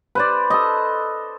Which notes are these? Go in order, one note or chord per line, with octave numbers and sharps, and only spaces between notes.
B4 C5 D5
A4 D#5